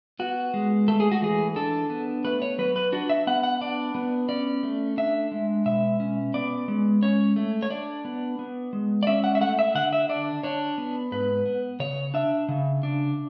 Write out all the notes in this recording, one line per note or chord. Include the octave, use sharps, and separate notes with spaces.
B3 F#4
G#3
A3 A4
G#4
F#4
E3 G#4
D4 A4
B3
A3 B4
C#5
F#3 B4
B4
D4 F#4
E5
B3 F#5
F#5
D4 D5
B3
C#4 D5
A3
D4 E5
G#3
B2 E5
C#4
B3 D5
G#3
C#4 C#5
A3
C#5
D4 D5
B3
B3
G#3
D5
C#4 E5
F#5
E5
A3 F#5
E5
D3 F#5
E5
D4 D5
D4 C#5
B3
G#2 B4
B3
C#3 C#5
D4 E5
C#3
D4